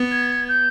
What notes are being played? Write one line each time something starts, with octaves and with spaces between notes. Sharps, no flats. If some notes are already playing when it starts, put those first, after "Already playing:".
Already playing: B3
G#6
G6